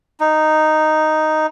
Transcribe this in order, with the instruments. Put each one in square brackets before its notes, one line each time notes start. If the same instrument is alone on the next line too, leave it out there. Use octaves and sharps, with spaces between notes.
[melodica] D#4